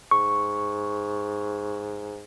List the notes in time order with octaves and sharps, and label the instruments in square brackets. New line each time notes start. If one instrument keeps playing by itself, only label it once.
[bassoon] G#2 [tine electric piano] C#6